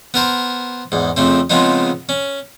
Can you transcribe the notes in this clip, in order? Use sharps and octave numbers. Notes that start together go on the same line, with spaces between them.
B3 A#4 C5
E2 G#2
F2 C#3 A3 C4
C#3 F3 G#3 B3 C4 D#4
C#4